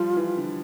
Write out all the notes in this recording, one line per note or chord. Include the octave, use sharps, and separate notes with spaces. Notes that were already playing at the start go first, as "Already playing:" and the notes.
Already playing: F3 G3 F4
E3
D3